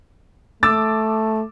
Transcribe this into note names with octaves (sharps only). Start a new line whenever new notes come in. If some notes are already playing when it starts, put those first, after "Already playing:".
A3 D6 E6 A6